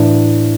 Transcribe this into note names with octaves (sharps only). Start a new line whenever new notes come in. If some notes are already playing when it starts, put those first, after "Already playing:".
Already playing: A2 E3 D4